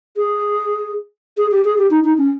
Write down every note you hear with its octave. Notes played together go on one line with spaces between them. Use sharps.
G#4
G#4
G4
G#4
G4
D#4
D#4
C#4